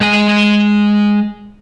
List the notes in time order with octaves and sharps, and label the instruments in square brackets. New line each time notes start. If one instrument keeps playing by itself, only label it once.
[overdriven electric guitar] G#3 G#5